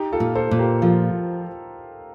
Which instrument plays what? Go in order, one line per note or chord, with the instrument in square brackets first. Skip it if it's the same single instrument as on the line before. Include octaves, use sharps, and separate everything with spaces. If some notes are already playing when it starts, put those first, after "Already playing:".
Already playing: [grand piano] D#4 G4
F4 A4
[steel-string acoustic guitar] A#2
[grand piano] A4 C5
[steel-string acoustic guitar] A#2
[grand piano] G4 A#4
[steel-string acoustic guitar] F3 [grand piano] F4 A4